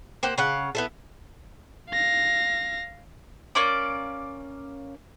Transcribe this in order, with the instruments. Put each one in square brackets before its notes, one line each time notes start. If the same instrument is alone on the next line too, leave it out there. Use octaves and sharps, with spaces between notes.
[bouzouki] A#3 G4 C5 F#5
C#3 F5 F#5
B3 E4 A4
[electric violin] F5 A#6
[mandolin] A#3 C#4 D5 D6